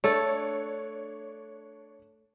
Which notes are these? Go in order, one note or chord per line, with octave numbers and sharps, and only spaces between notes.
A3 D4 A4 C#5